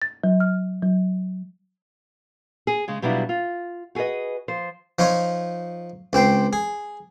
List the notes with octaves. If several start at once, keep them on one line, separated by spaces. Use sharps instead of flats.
A6
F#3
F6
F#3
G#4
C#3 G#3
B2 F#3 G3 D4 E4 F4
F4
F#4 G#4 A4 B4 D#5
F3 C5
F3 D#4 F4 C#5
C#2 C4 G5 C6
G#4